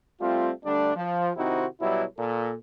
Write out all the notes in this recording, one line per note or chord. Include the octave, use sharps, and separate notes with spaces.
G3 A3 C4 F4
D3 G3 A3 D4
F3
C3 D#3 C4 D#4 E4 F#4
B2 F#3 G3 E4
A#2 A4